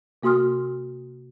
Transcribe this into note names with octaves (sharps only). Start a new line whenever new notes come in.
C3 A#3 F#4 C6 D#6 F6